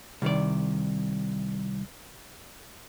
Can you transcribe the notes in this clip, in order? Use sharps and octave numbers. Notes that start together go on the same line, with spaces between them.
C2 D#3 D5